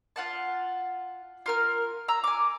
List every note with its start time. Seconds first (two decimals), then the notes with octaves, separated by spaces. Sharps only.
0.16 F4 F#5 A5
1.46 F4 A#4 F6
2.08 A#5 E6
2.24 G#5 D6